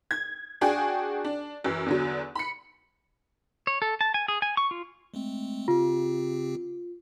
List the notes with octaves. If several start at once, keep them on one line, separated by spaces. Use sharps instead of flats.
G#6
D4 F#4 G#4 G5 G#5
D4
F#2 E3
E2 D3 F#3
B5 C#7
C#5
A4
A5
G#5
G#4
G#5
C#6
F4
G#3 A3 C4
C#3 C4 F4 G4